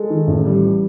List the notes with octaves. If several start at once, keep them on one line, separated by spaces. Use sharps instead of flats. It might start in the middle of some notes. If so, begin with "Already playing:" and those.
Already playing: G#3 A4
D#3
A1
G3
E3